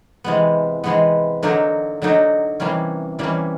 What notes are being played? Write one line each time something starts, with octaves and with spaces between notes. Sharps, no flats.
C3 E3 G#3 B3
C3 E3 G#3 B3
D3 F#3 A#3 D#4
D3 F#3 A#3 D#4
C3 E3 G3 A#3 C#4
C3 E3 G3 A#3 C#4